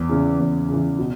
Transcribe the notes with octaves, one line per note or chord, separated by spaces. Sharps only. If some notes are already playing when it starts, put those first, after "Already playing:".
Already playing: E2
C#3 E3
E2
C#3 E3
B2